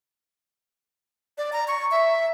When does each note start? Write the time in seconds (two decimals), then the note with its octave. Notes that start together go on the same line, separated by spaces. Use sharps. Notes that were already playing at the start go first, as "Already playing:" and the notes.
1.38 D5
1.53 A#5
1.68 C#6
1.91 E5